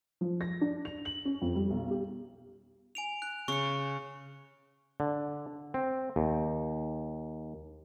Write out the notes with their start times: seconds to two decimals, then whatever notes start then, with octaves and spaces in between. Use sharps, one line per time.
0.21 F3
0.41 A#6
0.61 D4
0.85 F7
1.05 F#7
1.25 C#4
1.42 F2
1.55 G3
1.70 B1
1.91 G4
2.95 G#5 D7 F7
3.22 F#6
3.48 C#3 C#6 C#7
5.00 D3
5.74 C4
6.16 D#2